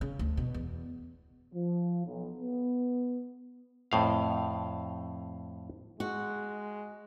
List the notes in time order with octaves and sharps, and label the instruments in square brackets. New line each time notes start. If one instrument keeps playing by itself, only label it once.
[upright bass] C#3
D2
B2
E2
[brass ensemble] F3
B1
B3
[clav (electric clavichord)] F2 A2 F5
[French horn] G#3 [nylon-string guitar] F#4